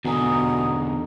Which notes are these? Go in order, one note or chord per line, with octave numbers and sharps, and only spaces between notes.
E2 B2 D3 G#5 A#5 D#6